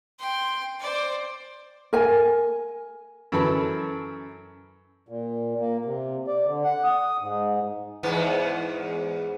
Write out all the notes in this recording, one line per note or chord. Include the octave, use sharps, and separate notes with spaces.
G5 C6
C5 D5
A#4 G#5
F#2 E3 A4 B5
A#2
A#3
C3
D5
D3
F#5
D#6
G#2
E2 G#2 B3